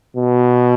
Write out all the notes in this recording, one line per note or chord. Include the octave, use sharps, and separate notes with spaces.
B2